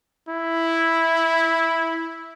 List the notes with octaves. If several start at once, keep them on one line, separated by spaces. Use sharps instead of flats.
E4